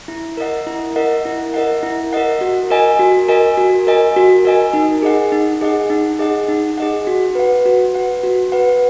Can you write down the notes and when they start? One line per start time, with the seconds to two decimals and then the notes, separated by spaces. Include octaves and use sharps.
0.08 E4
0.37 A#4 D#5 F#5
0.67 E4
0.96 A#4 D#5 F#5
1.25 E4
1.54 A#4 D#5 F#5
1.83 E4
2.13 A#4 D#5 F#5
2.41 F#4
2.71 A#4 D#5 G#5
2.99 F#4
3.28 A#4 D#5 G#5
3.57 F#4
3.87 A#4 D#5 G#5
4.16 F#4
4.45 A#4 D#5 G#5
4.73 D#4
5.03 G#4 D#5 F#5
5.32 D#4
5.61 G#4 D#5 F#5
5.90 D#4
6.19 G#4 D#5 F#5
6.48 D#4
6.78 G#4 D#5 F#5
7.07 F#4
7.35 B4 F#5
7.65 F#4
7.93 B4 F#5
8.23 F#4
8.52 B4 F#5